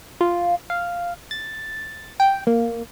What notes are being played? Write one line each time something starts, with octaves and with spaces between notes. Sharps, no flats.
F4
F5
A6
G5
A#3